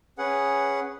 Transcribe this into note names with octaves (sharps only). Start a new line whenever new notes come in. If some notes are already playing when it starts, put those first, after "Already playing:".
C#4 G#4 B4 F#5